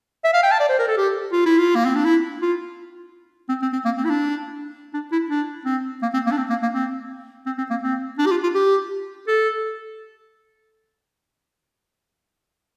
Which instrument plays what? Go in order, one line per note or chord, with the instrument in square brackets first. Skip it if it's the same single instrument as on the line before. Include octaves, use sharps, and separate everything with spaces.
[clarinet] E5
F5
G5
A5
D5
C5
A#4
A4
G4
F4
E4
F4
A#3
C4
D4
E4
F4
C4
C4
C4
A#3
C4
E4
D4
D4
E4
D4
C4
A#3
C4
A#3
D4
C4
A#3
A#3
C4
C4
C4
A#3
C4
D4
G4
F4
F4
G4
A4